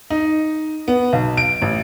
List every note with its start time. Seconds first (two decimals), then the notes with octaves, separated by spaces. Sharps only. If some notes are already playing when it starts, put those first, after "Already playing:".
0.10 D#4
0.88 B3
1.13 B1
1.37 D7
1.62 A1